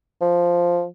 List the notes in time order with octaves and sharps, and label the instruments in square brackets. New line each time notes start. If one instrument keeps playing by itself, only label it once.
[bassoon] F3